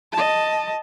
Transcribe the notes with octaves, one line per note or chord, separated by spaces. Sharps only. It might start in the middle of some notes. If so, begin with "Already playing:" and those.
D#5 A5